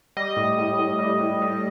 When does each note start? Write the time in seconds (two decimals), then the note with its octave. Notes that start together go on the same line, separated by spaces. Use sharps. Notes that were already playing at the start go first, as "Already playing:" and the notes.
0.17 G3 D#5
0.37 A2
0.58 A2
0.79 A2
0.99 G3
1.20 A2
1.42 G3